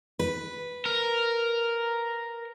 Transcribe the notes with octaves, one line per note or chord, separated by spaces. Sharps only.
B4
A#4